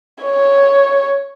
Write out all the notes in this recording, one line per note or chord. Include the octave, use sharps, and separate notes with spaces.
C#5